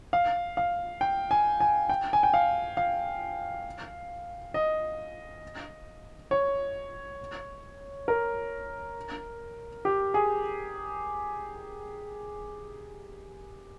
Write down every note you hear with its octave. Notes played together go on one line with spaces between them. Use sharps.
F5
F5
G5
G#5
G#5
G5
G#5
G5
F5
F5
D#5
C#5
A#4
G4
G#4